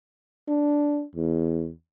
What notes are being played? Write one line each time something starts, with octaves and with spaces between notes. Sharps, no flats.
D4
E2